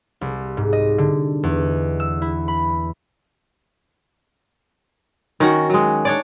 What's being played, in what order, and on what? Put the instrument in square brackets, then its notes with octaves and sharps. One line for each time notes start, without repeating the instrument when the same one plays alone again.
[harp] C2
G#2
D#5
D3
E2
E6
E4
B5
[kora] D#3 C#4 F#4 F#5
F#3 G#3
D4 C#5 D5